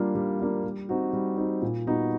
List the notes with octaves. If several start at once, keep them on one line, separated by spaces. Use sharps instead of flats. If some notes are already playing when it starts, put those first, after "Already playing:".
Already playing: G3 A#3 D4 F4
G3
A#3 D4 F4
G3
C4 D#4 F#4
G3
C4 D#4 F#4
A#2
G3 B3 D#4 F#4